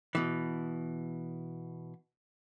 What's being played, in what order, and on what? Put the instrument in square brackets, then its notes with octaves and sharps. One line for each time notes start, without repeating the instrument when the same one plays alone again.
[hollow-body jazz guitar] B2 E3